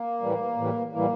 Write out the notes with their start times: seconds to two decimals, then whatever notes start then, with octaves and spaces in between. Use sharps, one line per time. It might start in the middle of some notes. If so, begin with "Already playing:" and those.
Already playing: A#3
0.21 A2 E3 G3
0.57 A2 E3 G3
0.93 A2 E3 G3 A#3